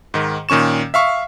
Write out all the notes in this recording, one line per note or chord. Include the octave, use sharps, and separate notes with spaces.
G#2 D#3
A#2 D#3 C#4 C#6 E7
E5 F5 C#6